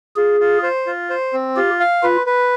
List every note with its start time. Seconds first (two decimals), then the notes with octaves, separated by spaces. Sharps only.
0.16 F4 G#4
0.40 F4
0.63 C5
0.87 F4
1.10 C5
1.33 C4
1.56 F4 G4
1.80 F5
2.03 F4 B4
2.26 B4